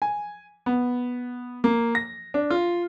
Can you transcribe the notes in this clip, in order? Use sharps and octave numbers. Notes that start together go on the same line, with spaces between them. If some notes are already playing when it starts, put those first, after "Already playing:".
G#5
B3
A#3
A#6
D4
F4